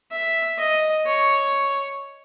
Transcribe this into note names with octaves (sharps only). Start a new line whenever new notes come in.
E5
D#5
C#5